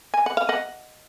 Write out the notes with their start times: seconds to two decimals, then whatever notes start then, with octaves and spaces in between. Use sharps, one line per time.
0.14 G#5
0.26 F#5
0.37 F5
0.49 D#5 F#5